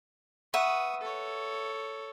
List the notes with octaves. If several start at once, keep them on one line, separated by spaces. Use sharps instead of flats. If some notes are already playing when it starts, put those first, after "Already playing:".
B4 E5 F#5 C#6 D#6
A4 C#5